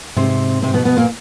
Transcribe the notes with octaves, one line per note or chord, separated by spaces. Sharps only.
G#2 C3 C4
C3 C4
B2 B3
B2 B3
A#2 A#3